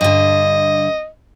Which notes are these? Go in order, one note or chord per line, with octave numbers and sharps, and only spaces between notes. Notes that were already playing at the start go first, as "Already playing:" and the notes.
G2 D3 D#5